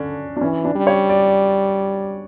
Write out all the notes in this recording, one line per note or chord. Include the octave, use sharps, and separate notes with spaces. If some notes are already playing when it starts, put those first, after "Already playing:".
Already playing: D3 C#4 D4
D4
E3 C#4
D4
G3
C#5
D5